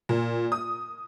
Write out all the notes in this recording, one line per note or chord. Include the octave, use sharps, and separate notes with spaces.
A#2
D#6